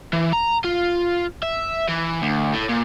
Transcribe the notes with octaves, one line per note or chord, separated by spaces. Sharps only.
E3
A#5
F4
E5
E3
D2
A2
A#2